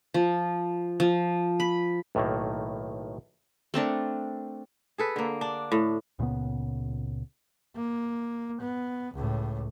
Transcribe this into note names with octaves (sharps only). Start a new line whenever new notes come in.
F3
F3
B5
B1 A2 D#3 A3 A#3
A3 C4 D4 A#4
G#4 A4 B4
D3 A#3
D4
A2
C#2 A#2 C#3 B3
A#3
B3
C#2 A2